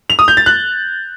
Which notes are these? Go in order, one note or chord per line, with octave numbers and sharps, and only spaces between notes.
F7
D#6
G6
A6
F#6